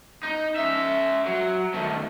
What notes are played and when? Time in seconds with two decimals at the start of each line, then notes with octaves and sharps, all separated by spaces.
0.23 D#4
0.56 C#4 E5
1.26 F#3
1.73 D#3 A3